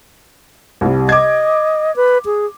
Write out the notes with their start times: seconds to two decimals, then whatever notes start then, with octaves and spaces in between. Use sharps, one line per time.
0.81 C2 G3
1.09 D#5 D6 G#6
1.96 B4
2.26 G#4